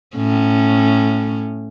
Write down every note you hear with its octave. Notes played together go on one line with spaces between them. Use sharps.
A2 C#4